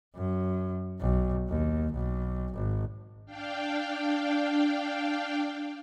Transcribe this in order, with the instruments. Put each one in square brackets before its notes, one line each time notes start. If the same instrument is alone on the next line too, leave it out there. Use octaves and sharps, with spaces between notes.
[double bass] F#2
B1
D#2
B1
G#1
[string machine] D4 F5 G5